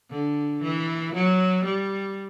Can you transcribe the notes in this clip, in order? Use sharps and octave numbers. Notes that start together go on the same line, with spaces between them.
D3
E3
F#3
G3